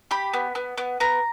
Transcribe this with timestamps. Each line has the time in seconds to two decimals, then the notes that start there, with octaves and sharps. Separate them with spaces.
0.11 G4 B5
0.33 B3
0.55 B3
0.78 B3
1.00 B3 A#5